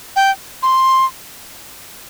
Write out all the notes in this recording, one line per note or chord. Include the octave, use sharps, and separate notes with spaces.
G5
C6